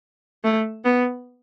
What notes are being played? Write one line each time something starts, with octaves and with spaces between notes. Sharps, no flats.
A3
B3